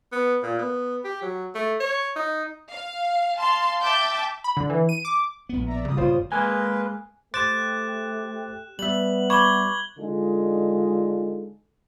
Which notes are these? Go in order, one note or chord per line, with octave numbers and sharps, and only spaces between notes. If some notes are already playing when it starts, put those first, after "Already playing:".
B3
A#2
B3
G4
F#3
A3
C#5
D#4
F5
F5 A5 C6
E5 G5 A5 D6 G6
B5
D3
E3
D#7
D6
A#1 A2 B3
D5 E5 A#5
A#2 C#3 G3 D#6
G1 F4 C5 C#5
G#3 A#3 B4 G#5
A3 G4 C5 D6 F#6 A6 E7
G3 B3 E5 F#7
B5 C#6 D6 G#6 F#7 G7
D3 G#3 D4 D#4 F4 A4